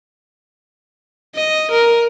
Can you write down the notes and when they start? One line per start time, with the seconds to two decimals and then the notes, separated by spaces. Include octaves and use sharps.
1.36 D#5
1.71 A#4